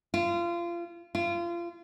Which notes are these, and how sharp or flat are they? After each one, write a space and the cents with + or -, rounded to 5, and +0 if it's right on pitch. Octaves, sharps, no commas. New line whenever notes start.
F4 -25
F4 -30